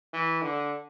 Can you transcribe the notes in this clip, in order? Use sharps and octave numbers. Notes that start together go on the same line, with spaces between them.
E3
D3